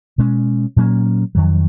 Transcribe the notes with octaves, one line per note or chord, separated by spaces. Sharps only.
B2 G#3 C#4
A#2 F#3 A#3 C#4
F2 D#3 F#3